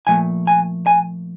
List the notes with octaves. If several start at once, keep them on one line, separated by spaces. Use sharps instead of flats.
A#2 F3 A3 G#5
G#5
G#5